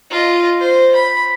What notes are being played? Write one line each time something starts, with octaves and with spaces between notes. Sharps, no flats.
F4 D#5
C5
B5